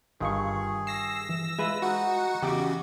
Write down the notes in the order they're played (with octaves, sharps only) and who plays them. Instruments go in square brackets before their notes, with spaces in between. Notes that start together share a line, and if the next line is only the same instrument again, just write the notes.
[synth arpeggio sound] G1 F4 C#6 [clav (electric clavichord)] G2 D#3 [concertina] G#4
[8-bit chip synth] E6 A#6 [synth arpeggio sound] C7
[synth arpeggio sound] E3
[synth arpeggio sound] G#3 [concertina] E4 [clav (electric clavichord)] F4 B4 E5
[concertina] D#4 [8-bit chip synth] F#4 F#5
[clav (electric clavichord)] E2 [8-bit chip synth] C#3 F#4 [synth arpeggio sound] G4 D6